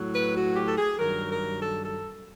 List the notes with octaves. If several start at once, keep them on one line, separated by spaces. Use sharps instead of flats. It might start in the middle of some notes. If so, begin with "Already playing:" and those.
Already playing: A2 F#3
B4
F#4
G4
A4
G#4
G2 D#3 F#3 A#4
A#4
A4
A4